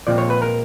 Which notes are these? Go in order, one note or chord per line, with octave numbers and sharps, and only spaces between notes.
A#1 A#2 F3 G#3 C4 D5
C#5
B4
A#4